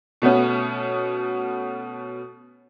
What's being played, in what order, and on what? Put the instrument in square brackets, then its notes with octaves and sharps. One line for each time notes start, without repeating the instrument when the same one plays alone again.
[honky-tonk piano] B2 A3 B3 C#4